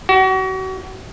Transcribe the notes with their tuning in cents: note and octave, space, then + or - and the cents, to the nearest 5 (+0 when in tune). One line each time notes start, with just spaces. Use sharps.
F#4 +35